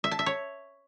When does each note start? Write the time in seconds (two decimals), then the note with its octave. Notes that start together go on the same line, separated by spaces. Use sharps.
0.04 E5
0.11 A5
0.19 E5
0.26 C#5